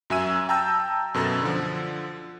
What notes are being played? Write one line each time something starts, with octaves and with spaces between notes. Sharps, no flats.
F#2 F#3 E5 G#5 E6 D#7
G5 A5 A#5 E6 G6
F#2 B2 A4 E6 A6
D3 F3